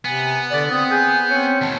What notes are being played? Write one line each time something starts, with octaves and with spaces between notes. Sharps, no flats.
C3 B3 G#5
D3 D5
C4 D#6
G#4 G6
C4 C#4
D#2 B2 A5